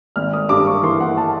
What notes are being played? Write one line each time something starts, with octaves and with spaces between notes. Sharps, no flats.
G#1 F6
D#6
G2 D6
C#6
E3 C6
F#5
A5